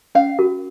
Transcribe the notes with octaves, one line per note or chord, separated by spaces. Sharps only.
C#4 F5
F#4 A#4